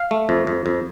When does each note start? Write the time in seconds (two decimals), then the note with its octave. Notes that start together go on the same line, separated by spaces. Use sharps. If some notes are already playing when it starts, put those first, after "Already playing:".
Already playing: F5
0.11 A3
0.29 F2
0.47 F2
0.66 F2